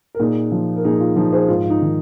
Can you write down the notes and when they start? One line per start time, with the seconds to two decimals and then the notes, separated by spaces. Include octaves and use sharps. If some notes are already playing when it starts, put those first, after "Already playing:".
0.15 A#4
0.20 A#2 D#4 G#4
0.52 F3
0.76 A#4
0.85 A#2 D#4 G#4
1.00 F4
1.16 F3 D#4 G#4
1.32 G#4 C5
1.48 G#2 F4
1.64 F4
1.70 D#4
1.81 D#3